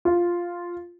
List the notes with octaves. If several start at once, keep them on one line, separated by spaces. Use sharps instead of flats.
F4